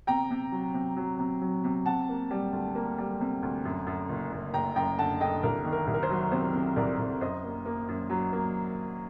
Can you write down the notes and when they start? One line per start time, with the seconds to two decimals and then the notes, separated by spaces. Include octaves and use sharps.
0.07 C3 G5 A#5
0.31 C3
0.52 F#3
0.74 C3
0.96 F#3
1.19 C3
1.41 F#3
1.64 C3
1.86 C3 F#5 A5
2.09 A#3
2.31 G3
2.53 D2
2.75 A#3
2.98 G3
3.21 C3
3.43 D2
3.65 F#2
3.87 F#2
4.09 F#1
4.32 F#1
4.54 F#1 G5 A#5
4.75 F#2 G5 A#5
4.98 D3 F#5 A5
5.20 D3 D#5 G5
5.43 C2 A#4
5.65 D#3
5.72 A#4
5.87 C2
5.94 A#4
6.03 C5
6.10 F#3
6.32 C3 C5
6.54 C3
6.76 C2 A#4 D5
6.99 C2
7.21 F#2 C5 D#5
7.44 A#3
7.65 A#3
7.88 F#2
8.10 F#3
8.33 A#3